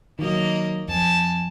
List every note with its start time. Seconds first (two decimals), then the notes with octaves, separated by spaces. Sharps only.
0.19 D#3 F#3 A#3 D#5
0.88 F2 G#5 A5